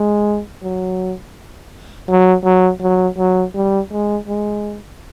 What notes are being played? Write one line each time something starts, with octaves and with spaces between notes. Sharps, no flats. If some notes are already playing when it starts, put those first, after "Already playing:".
Already playing: G#3
F#3
F#3
F#3
F#3
F#3
G3
G#3
G#3